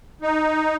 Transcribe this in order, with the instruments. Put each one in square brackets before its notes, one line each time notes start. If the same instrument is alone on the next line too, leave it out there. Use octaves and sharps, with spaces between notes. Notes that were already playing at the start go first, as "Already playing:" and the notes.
[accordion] D#4